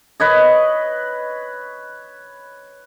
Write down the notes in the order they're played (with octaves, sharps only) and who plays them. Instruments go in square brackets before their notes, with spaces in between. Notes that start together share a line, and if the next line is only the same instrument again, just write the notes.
[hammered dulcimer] B4 C#5 D#5